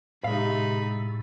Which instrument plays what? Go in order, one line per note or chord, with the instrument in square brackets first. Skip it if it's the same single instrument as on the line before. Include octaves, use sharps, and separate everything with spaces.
[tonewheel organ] A2 [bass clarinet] C3 [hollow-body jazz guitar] G#3 F5 [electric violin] D#4 B5